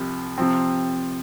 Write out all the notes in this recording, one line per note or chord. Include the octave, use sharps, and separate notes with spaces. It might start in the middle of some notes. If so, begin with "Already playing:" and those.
Already playing: C2 C3 F3
C3 F3 C4